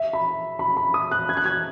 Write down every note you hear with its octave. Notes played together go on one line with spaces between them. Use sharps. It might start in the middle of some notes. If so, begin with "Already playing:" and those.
Already playing: E5
B5
B5
B5
D#6
F#6
G#6
F#6
G#6